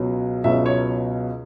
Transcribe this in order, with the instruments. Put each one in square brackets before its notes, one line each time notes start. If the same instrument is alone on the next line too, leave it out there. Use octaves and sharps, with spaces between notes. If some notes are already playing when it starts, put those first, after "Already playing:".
Already playing: [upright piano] C#2 B2 F#3
C#2 B2 F#3 E5
C#5